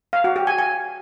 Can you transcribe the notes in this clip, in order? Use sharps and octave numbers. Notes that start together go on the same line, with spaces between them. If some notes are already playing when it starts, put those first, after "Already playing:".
F5
F#4
G4
G#5
G#5